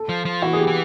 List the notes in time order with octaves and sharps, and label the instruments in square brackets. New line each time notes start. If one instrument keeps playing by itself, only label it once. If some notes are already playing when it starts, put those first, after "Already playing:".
Already playing: [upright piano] A4
[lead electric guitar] F3
F3
[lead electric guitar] E3 [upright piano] F#4
[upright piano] G#4
G4
[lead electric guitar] E3